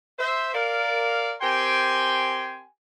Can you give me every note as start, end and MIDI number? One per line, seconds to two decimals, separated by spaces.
0.19 0.52 72
0.19 0.52 76
0.54 1.34 70
0.54 1.34 74
0.54 1.34 77
1.41 2.64 60
1.41 2.64 67
1.41 2.64 70
1.41 2.64 79
1.41 2.64 80
1.41 2.64 84